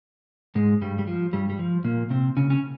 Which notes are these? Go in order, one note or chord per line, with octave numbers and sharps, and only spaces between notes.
G#2 G#3
G2 G3
G3
F3
G2 G3
G3
F3
A#2 A#3
C3 C4
C#3 C#4
C#4